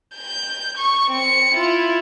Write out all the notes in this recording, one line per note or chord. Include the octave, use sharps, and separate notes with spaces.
G6
C#6
C4 C#7
E4 F4